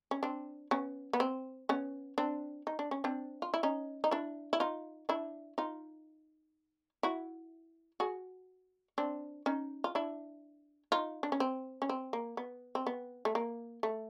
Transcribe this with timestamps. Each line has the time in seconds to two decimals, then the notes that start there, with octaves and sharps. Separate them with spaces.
0.11 C#4
0.23 C4 D4
0.71 B3 C#4
1.13 B3
1.20 C4
1.69 B3 C#4
2.18 C4 D4
2.67 D#4
2.79 D4
2.91 C#4
3.04 C4 D4
3.42 F4
3.54 E4
3.63 C#4 D#4
4.04 D#4
4.11 D4 E4
4.53 E4
4.60 D#4 F4
5.09 D4 E4
5.58 D#4 F4
7.03 E4 F#4
8.00 F#4 G#4
8.98 C4 D4
9.46 C#4 D#4
9.84 F4
9.95 D4 E4
10.92 D#4 F4
11.23 D4
11.32 C#4
11.40 C4
11.82 C#4
11.89 C4
12.13 A#3
12.37 B3
12.75 C4
12.87 B3
13.25 A3
13.35 A#3
13.83 A3